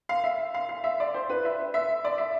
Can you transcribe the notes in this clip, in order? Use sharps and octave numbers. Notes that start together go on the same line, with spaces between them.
F5
E5
F5
F5
E5
D5
C5
B4
E5
E5
D5
E5